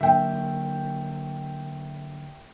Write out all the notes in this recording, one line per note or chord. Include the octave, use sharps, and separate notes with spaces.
D3 F#3 A#3 E5 G5